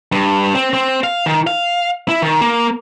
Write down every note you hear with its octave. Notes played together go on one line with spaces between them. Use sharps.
G2
C4
C4
F5
D#3
F5
E4
D#3
A#3